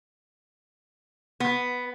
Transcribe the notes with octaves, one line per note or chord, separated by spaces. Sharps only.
B3